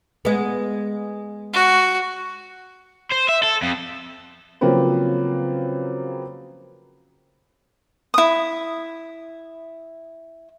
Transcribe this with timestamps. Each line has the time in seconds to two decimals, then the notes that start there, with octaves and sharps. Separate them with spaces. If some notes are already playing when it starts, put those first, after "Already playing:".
0.25 G#3 B3
1.53 F#4
3.11 C5
3.29 E5
3.43 A4
3.62 F2
4.61 C#3 F3 F#3 A#3 C4 B4
8.14 E4 D#6